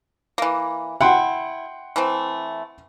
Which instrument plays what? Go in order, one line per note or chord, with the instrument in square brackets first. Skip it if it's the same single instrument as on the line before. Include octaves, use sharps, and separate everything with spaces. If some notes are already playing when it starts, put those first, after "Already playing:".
[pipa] E3 A#3
[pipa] E4 [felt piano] F#5 G5 C6
[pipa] E3 A3 C4